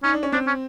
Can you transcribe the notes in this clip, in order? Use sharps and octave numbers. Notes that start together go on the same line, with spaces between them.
C#4 D#4
D4
C#4
C4 D4
C#4